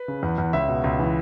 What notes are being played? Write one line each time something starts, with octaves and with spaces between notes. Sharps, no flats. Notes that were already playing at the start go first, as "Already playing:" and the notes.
Already playing: B4
C#3
E2
E2
C#2 E5
B2
C#2
E3